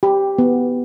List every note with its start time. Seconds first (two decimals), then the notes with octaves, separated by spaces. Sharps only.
0.03 G4
0.38 B3